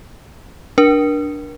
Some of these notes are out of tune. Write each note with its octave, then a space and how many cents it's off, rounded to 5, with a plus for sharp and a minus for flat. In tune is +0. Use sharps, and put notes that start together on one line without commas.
D4 +0 A#4 +35